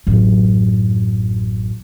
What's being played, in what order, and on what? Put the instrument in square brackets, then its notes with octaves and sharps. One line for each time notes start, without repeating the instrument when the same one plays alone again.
[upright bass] A1 F#2